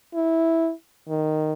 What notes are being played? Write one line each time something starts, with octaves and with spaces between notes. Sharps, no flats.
E4
D#3